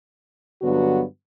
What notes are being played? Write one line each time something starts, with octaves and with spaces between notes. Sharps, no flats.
G2 D3 F#3 B3 F#4